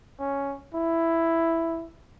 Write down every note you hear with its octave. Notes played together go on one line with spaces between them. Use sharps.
C#4
E4